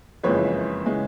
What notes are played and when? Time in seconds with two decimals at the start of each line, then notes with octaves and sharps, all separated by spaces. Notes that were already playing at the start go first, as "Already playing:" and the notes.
0.23 F#1 F2 C#3 E3 G#3 B4 C#5
0.86 C#3 E3 G#3